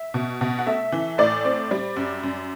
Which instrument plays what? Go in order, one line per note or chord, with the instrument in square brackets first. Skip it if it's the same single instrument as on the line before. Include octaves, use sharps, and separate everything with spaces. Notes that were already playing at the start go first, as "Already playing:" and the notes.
Already playing: [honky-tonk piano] E5
B2
B2
F#5
A3 E5
E3
A2 D5
C4
G3
F#2
F#2